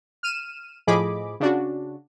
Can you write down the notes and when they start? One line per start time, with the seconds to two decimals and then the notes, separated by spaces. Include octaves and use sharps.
0.23 F6 D#7 E7
0.87 A2 F3 G#4 D#5 B5 D6
1.40 C#3 D4 F#4